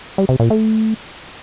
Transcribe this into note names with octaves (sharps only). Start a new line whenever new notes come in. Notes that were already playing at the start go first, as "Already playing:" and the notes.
G3
C3
A#2
A3